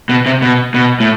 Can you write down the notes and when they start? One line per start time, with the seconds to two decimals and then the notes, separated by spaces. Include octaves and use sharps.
0.09 B2
0.26 C3
0.42 B2
0.74 B2
1.00 A2